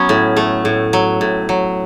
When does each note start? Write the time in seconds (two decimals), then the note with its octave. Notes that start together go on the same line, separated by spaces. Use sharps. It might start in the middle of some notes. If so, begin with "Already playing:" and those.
Already playing: F#3 B3 C#4
0.09 A2
0.37 A3
0.65 A2
0.93 F#3
1.21 A2
1.49 F#3